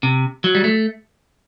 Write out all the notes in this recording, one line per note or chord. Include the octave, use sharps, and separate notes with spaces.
C3
F#3
G3
A3